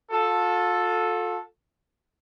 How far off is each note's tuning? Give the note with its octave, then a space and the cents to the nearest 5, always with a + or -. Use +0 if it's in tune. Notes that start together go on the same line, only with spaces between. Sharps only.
F4 +40 A4 +0